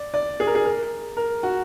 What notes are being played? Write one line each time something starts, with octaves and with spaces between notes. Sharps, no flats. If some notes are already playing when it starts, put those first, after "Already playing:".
Already playing: D5
D5
G#4
A#4
G#4
A#4
A#4
F#4